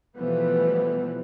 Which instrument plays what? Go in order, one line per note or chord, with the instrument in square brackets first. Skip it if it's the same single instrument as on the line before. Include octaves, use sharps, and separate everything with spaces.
[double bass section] B2 E3 F3 G3 A3 B3